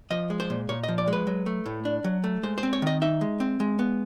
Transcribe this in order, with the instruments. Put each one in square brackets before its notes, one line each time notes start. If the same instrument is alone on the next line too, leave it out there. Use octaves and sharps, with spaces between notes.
[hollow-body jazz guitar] F3 D#5
G#3
C5
A#2
A#2 C#5
F3 D#5
D5
G#3
B4
F#3
A3
A2
D4
F#3
A3
G#3 C5
C5
C4
C#5
D#3 D#5
D#4 E5
G#3
C4
G#3
B3